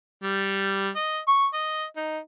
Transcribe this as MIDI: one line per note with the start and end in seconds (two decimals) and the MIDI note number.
0.23 0.89 55
0.96 1.19 75
1.27 1.47 85
1.53 1.84 75
1.96 2.19 63